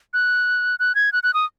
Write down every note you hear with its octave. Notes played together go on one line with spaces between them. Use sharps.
F#6
F#6
G#6
F#6
F#6
D#6